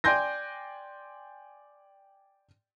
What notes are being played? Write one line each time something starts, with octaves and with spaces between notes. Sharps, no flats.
D5 G5 G#5 C6 G6 A#6